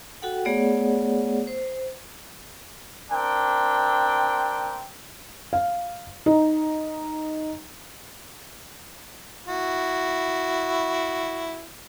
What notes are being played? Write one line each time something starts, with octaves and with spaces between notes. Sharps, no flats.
F#4 A4 F#5 G5
A3 B3 G#4 C#5 D5 F#5
C5
C4 D4 A#4 G5
F5
D#4
E4 F#4